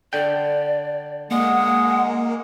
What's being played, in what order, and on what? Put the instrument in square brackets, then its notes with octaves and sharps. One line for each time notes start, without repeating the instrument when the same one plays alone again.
[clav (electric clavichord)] D3 G5 [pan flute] D5
[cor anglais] G#3 [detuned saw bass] A#3 [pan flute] F#5